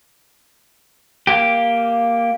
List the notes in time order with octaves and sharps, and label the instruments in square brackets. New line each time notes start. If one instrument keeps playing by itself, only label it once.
[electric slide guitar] A#3 G4